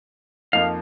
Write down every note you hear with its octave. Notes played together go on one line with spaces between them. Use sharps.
F2 F3 A#3 D#4 F5